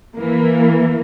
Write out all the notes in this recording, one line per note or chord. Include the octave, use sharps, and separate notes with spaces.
E3 A#3